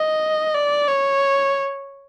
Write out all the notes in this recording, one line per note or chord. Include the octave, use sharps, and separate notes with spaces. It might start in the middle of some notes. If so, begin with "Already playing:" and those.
Already playing: D#5
D5
C#5